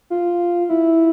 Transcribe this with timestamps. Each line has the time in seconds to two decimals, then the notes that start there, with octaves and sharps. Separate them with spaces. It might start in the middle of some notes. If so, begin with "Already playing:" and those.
0.10 F4
0.69 E4